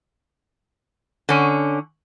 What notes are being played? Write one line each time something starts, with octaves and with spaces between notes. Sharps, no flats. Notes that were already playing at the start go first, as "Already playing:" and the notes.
D3 C#4